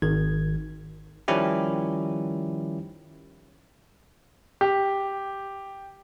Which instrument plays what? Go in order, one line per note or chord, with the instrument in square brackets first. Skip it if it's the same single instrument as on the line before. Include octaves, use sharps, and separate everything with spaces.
[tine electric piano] G#1 D#3 G#6
D#3 F3 G3 C#4 E4 G4
[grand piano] G4